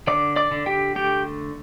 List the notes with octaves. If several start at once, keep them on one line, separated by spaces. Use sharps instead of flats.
D3 D5 D6
D5 D6
D3
G4 G5
A3 G4 G5